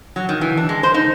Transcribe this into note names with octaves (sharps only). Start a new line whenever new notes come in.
F#3
D#3
E3
D4
G#3
C5
D#4